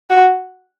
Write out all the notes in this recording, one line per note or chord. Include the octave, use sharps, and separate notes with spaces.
F#4